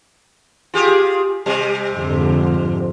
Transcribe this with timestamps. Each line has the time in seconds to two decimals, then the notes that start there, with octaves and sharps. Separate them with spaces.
0.74 F4 G4 G#4
1.46 C3 G3
1.93 F2 G#2 D3